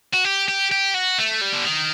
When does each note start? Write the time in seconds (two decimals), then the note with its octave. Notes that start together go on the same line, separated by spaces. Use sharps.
0.14 F#4
0.25 G4
0.48 G4
0.72 G4
0.94 F#4
1.18 A3
1.41 G3
1.53 D3
1.65 D#3